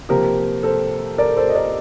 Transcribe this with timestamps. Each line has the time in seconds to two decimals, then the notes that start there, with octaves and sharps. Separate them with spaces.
0.09 C3 F3 A#3 G4 A#4
0.63 A4 C5
1.18 A#4 D5
1.37 A4 C5
1.49 D#5
1.55 A#4 D5